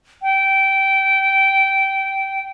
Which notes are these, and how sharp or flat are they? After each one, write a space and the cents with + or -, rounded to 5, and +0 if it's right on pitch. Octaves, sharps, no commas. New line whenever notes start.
G5 -15